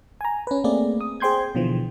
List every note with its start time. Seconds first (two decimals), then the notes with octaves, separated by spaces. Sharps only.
0.21 G#5 A#5
0.47 C#4 B4
0.64 A3 A#3 C4 G#4 D5
1.01 D#6
1.20 G#4 C5 G5 C6 G6 G#6
1.55 B2 D3 E3 F3